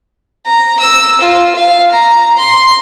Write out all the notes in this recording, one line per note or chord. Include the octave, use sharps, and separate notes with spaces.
A#5
E6
F4
F5
A#5
C6